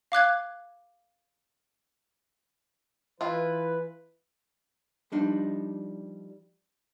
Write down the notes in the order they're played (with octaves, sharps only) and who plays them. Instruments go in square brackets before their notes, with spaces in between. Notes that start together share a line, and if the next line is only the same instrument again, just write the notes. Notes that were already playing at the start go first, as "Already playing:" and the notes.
[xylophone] F5 D6 F#6 G#6
[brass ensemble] E3 B4 [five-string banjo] E4 F4
[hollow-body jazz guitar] F3 G3 D4 D#4